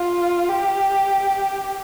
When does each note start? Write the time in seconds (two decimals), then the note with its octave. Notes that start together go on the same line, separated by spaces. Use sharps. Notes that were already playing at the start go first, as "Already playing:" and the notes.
Already playing: F4
0.49 G4